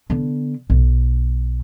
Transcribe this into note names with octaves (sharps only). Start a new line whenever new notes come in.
D3 B3
B1